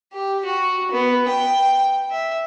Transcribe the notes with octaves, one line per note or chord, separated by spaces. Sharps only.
G4
F#4
B3
G5
E5